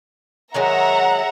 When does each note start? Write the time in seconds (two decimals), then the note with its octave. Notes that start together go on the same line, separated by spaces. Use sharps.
0.54 D#3 F#3 G#3 E5 F#5 A#5